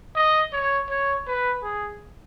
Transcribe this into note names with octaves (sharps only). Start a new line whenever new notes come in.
D#5
C#5
C#5
B4
G#4